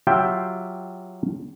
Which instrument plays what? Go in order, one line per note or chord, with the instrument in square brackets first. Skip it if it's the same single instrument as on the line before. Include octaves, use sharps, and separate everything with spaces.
[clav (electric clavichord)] F#3 F4 G4 E5 F5 G5